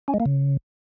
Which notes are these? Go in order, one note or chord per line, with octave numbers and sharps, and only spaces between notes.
C#4
G#3
A#3
C#3